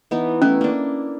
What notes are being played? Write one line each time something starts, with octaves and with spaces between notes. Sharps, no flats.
E3 B3 D#4
A3 B3 C#4 E4
A#3 D4